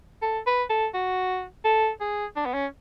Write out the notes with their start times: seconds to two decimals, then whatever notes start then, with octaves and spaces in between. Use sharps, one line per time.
0.22 A4
0.46 B4
0.70 A4
0.94 F#4
1.65 A4
2.01 G#4
2.36 D4
2.46 B3
2.54 C#4